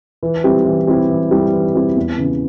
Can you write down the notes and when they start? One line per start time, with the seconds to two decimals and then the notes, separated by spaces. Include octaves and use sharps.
0.23 E3
0.44 G3 C4 E4 G4
0.66 E3
0.87 G3 C4 E4 G4
1.09 E3
1.31 G3 C4 E4 G4
1.53 E3
1.75 G3 C4 E4 G4
1.96 E2
2.18 C#3 E3